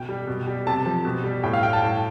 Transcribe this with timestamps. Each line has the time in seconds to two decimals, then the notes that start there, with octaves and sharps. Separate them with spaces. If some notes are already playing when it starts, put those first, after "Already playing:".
Already playing: B2 G5
0.09 G3
0.27 B2
0.47 G3
0.67 C3 A5
0.86 F3
1.05 B2
1.24 G3
1.43 A2 G5
1.53 F5
1.63 G3 G5
1.73 A5
1.82 A2 G5